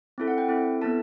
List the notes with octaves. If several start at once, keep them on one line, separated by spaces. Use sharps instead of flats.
C4 E4 A4
F#5
G5
C4 E4 A4
B3 E4 A4 A5